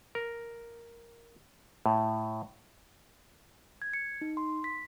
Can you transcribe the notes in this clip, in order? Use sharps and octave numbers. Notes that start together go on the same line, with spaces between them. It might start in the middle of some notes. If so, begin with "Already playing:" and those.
A#4
A2
G#6
C#7
D#4
C6
B6